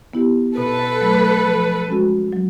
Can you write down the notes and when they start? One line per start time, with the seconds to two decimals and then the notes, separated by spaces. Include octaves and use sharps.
0.14 B3 E4 G4
0.57 B2 A4 B4
1.01 F#3 A3
1.45 F3
1.88 G#3 C#4 F#4
2.33 F#3